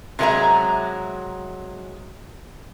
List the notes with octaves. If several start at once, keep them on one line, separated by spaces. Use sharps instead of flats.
C3 F#3 G#3 A#4 E5 A#5